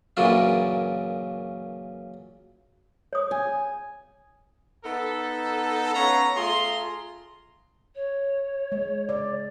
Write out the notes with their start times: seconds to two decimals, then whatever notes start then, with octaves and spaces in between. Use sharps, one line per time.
0.17 F#2 A#2 C#3 E3 F#3 D4
3.13 C#5 D#6
3.31 G#5
4.85 B3 D#4 A4
5.94 B3 C#4 C#5 F5 A#5
6.36 A3 F4 G#4 A#5 C6
7.95 C#5
8.72 G#3
9.09 C#3 D5